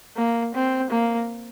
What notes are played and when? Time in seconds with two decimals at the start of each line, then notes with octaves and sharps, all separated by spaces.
0.17 A#3
0.54 C4
0.90 A#3